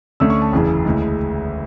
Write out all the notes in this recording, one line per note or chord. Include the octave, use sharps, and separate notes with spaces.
D2 D3 A3 C#4 E6
C#6
A5
F#1 E2 C#3 E3
D2 C#3 E3 G#3